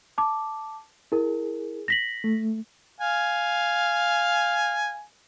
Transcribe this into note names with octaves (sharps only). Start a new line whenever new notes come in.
A5 D6
E4 G#4 A#4
A#6 B6 F#7
A3
F5 G#5